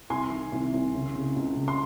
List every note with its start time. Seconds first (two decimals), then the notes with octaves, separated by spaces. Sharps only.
0.10 C2 G#5 C6
0.31 D#3
0.52 C2
0.74 C2
0.95 C#3
1.15 C#3
1.36 C#2
1.57 C#3
1.68 C6